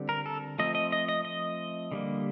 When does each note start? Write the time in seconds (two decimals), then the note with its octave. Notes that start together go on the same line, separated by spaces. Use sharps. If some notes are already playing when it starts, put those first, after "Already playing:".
Already playing: D3 G3 C4
0.09 A#4
0.26 A4
0.59 F3 A3 C4 D#5
0.75 D#5
0.92 D#5
1.09 D#5
1.25 D#5
1.92 D3 G3 A#3